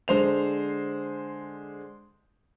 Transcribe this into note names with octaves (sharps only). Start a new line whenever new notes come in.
D3 G#3 C5 F7